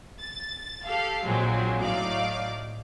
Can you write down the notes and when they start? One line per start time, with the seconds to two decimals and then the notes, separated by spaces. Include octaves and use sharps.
0.19 A6
0.84 G4 A4 F5
1.24 A#1 A#2 F#3 G#3 C4
1.80 A2 F#3 D#4 D5 F5 D6